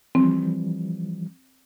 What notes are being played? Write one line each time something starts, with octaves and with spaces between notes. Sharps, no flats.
E3 F3 G3 C4